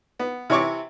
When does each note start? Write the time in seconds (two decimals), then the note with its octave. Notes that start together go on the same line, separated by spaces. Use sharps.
0.19 B3
0.50 C3 E3 C#5 C#6 D6